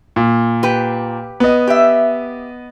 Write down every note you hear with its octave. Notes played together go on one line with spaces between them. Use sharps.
A#2
G4 B4
B3 D#5
G4 E5